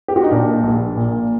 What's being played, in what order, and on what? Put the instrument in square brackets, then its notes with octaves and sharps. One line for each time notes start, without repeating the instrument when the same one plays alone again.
[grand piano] G4
F#4
D#4
A#2 D4
A#1
A#2